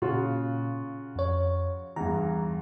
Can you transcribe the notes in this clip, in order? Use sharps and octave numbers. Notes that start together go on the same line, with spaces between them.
A#2 C#3 F4 F#4
F2 C#5
E2 G2 A#5